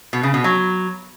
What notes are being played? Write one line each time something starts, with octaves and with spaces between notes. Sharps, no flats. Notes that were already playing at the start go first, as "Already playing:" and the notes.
B2
C#3
B2
F#3